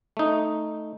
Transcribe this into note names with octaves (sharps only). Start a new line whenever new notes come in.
A3 D#4